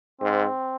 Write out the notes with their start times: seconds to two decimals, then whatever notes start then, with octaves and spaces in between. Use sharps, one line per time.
0.21 G#2 C4